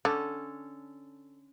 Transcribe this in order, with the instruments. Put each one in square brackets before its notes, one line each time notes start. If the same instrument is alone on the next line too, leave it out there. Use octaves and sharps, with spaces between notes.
[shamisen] D3 [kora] C#4 A4